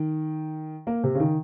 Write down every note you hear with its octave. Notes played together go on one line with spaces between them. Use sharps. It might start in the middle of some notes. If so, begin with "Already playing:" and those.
Already playing: D#3
A#3
C3
C#3
D#3